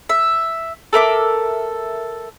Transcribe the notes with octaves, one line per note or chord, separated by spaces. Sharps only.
E5
A4 A#4 E5 D6